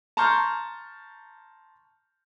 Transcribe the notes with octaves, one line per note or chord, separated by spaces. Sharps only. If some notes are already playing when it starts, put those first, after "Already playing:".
A5 A#5 C6 C#6 F6 G6